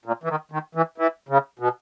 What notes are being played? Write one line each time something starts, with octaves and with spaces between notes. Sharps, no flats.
A#2
E3
D#3
D#3
E3
E3
C#3
B2